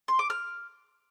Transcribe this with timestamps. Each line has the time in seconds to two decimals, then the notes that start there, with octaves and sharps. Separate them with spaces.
0.08 C6
0.19 D6
0.30 F6